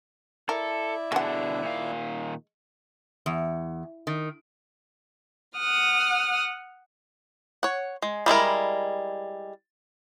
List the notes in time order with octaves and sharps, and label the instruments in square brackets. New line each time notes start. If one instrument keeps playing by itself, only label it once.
[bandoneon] E4 D5 E5 [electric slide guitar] A4 [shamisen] A#4
[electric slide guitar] B2 D3 D4 [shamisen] G#3 F#5
[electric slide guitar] A#2 D#3 F5
[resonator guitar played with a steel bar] E2
D#3
[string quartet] F#5 D#6 F6
[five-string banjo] C#5 F#5
G#3
G3 G#3 E4 A#4